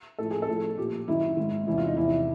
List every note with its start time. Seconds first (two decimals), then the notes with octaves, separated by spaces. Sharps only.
0.18 A2 F3 A4
0.31 G#4
0.42 A4
0.48 A2 F3
0.77 A#2 F3 G4
1.08 F#2 D#3 E4
1.37 G#2 D#3
1.67 E2 C3 E3 E4
1.78 F4
1.87 D#4
1.97 E2 C3 F3 E4